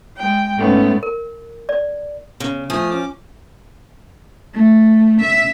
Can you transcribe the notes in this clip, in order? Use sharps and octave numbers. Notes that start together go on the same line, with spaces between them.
G#3 G5
G#2 G#3 A3 B3 C#4
A#4
D5
C#3
F3 A3 G#5 D#6
C#4 D6
A3
E5